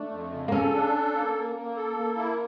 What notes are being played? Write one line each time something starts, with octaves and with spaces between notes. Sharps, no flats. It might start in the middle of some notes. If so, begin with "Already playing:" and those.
Already playing: A3 D4
F2
C#3
A#3
C#4 A4
D4
A4
A#3
A#3
A#3
A4
A#3
E4